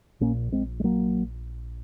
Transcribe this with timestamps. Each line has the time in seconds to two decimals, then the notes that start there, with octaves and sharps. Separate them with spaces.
0.20 A#1 A#2 A#3 C#4
0.52 G#3 C4
0.80 G#3
0.84 F#3 A#3